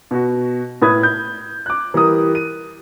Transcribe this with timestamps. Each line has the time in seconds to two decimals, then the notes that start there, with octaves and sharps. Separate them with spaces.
0.11 B2 F#4
0.82 A2 B4 B5 D#6 G#6
1.03 G6
1.66 D6 F#6
1.94 E3 G3 G4 A#4 D#6
2.35 D#7